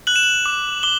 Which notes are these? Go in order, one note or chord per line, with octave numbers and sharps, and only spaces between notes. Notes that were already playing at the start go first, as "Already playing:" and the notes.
F#6 F#7
E7
F#7
D6
D6 G7